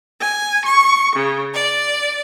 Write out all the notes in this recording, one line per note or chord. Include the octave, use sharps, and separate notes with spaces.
G#5
C#6
C#3
D5